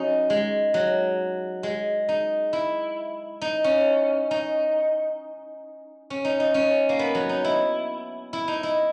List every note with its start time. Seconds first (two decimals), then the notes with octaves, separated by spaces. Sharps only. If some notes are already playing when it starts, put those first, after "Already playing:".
Already playing: F#3 C#4 D#4
0.30 G#3
0.74 F#3
1.63 G#3
2.09 D#4
2.53 E4
3.41 D#4
3.64 C#4
4.31 D#4
6.10 C#4
6.25 D#4
6.40 D#4
6.54 C#4
6.89 A#3
6.99 B3
7.15 F#3
7.29 D#4
7.44 E4
8.33 E4
8.48 D#4
8.63 E4